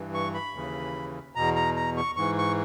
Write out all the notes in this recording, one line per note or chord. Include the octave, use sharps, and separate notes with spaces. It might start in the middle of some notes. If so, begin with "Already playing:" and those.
Already playing: G2 E3
C#6
B5
D#2 C#3 E3
E2 B2 A#5
A#5
A#5
C#6
G#2 E3 C#6
C#6